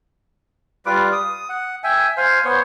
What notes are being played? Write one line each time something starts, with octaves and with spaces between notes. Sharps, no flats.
G3 F4 B4 D6
D#6
F#5
E5 G5 G#5
C5 F5 G#5
B3 C5 C#5